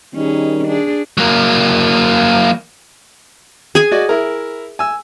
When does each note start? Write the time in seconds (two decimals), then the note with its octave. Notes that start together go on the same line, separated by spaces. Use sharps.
0.14 D#3 G3 C#4 D#4 G#4
0.67 D4 G#4
1.17 F#3 A#3
3.75 G#4 G#5
3.92 F#4 D5 D#5
4.09 E4 A#4
4.79 G#5 E6